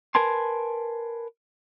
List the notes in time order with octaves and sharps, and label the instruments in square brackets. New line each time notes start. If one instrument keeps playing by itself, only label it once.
[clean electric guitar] A#4 B4 G#5 A5 C6